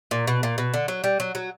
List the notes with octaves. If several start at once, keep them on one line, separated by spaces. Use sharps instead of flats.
A#2
B2
A#2
B2
D3
F#3
G3
F#3
F#3